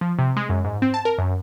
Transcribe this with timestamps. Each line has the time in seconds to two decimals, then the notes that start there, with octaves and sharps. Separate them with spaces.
0.01 F3
0.19 C3
0.36 G#3
0.49 F#2
0.65 G#2
0.82 C4
0.94 A5
1.05 A#4
1.18 F#2